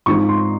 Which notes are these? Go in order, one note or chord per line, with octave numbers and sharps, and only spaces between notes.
G#2 F3 C4 D#4 C#6
C6